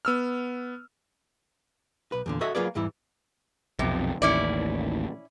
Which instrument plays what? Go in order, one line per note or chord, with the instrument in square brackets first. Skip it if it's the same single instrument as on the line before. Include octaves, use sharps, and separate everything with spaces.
[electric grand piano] B3 E6 F6
[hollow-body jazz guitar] B1 B4
E2 A#2 D3
F#4 A4 C#5 D#5 E5
F#3 A#3 F4 G#4 B4 D5
E2 G#2 E3 G3 E4
[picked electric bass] B1 F2 [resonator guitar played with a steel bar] C3
[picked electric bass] A1 D#2 [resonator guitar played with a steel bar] C#4 E4 D5